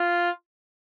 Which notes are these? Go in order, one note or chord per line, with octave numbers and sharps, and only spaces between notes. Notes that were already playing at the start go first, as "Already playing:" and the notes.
Already playing: F4